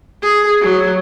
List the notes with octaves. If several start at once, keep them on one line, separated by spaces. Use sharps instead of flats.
G#4
F#3